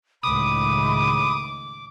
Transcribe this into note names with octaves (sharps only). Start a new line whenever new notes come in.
C#2 A2 D#3 B5 D6 D#6